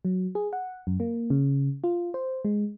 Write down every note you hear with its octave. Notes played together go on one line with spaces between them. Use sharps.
F#3
G#4
F#5
F#2
A#3
C#3
F4
C5
G#3